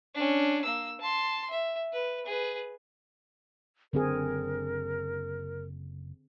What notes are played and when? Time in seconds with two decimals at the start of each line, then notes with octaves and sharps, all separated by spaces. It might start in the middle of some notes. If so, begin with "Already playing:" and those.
0.14 C#4 D4
0.64 A#3 E6
1.01 A5 C6
1.50 E5
1.93 B4
2.26 G#4 B4
3.93 F#1 D3 C4 G#4 A#4